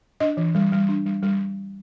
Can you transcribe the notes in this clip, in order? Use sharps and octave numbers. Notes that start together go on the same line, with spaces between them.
D4 D#5
E3
G3
G3
D4
G3
G3